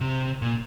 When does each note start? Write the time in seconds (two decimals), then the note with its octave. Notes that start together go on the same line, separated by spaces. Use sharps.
0.01 C3
0.42 A#2